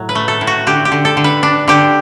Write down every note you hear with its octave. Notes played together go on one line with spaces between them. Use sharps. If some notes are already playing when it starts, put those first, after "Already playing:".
Already playing: A2 F#3
B4
A3
A4
A2
F#4
D3 G4
G4
D3
A4
D3
B4
D4
D3 G4